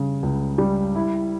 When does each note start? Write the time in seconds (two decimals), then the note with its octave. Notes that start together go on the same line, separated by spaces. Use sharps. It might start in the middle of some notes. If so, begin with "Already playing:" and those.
Already playing: C#3 G3
0.23 C#2
0.58 G3
0.95 E4